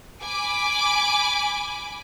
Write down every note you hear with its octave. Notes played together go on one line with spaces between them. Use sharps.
G#5 B5 D6